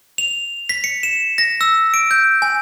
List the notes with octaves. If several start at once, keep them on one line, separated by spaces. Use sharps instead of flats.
F7
B6
C#7
E7
A#6
E6
D7
G6
G#5